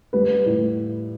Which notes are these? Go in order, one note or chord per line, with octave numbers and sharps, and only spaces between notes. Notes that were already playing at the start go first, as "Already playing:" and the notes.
G3 B4
A2